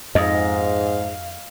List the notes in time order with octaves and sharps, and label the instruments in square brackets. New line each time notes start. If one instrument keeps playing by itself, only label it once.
[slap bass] F2 [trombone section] G#2 [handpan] D#5 [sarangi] F5